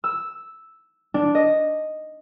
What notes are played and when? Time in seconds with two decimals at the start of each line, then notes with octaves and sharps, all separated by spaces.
0.04 E6
1.14 D4
1.35 D#5